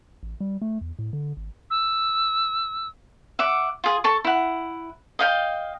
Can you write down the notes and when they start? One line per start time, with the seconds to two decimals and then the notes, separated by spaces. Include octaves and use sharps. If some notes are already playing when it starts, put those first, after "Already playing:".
0.23 A1
0.40 G3
0.62 A3
0.81 E2
0.99 A2
1.13 D3
1.37 G#1
1.70 E6
3.39 E5 F#5 D6
3.84 F4 G#4
4.04 A4 A5 C#6
4.24 E4 F#5
5.19 D#5 F5 G5